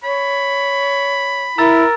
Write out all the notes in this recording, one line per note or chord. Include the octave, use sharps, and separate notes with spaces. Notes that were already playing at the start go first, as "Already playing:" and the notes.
C#5 B5
E4 A#4 A#5 E6 A6